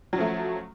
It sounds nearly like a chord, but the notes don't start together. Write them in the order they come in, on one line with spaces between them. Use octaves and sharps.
F#3 C#4 F3 A3